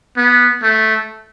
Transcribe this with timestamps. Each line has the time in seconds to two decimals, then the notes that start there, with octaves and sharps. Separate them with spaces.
0.17 B3
0.62 A3